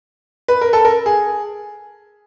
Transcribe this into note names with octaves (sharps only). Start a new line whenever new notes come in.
B4
A#4
A4
A#4
G#4